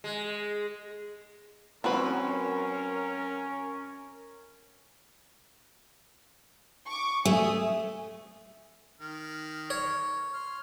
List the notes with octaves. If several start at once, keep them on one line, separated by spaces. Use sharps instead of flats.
G#3
F#2 C4 C#4 F#4 A#4 B4 C#5
C#6 D6
A3 G#5 D#6
D#3 F6
C#5
C6 F6